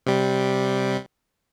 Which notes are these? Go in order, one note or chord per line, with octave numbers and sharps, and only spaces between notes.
C3 G3